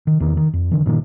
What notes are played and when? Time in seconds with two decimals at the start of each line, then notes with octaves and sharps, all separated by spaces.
0.07 D#3
0.20 E2 D#3
0.37 D#3
0.53 F2
0.71 D3 E3
0.86 G2 A#2 D3 D#3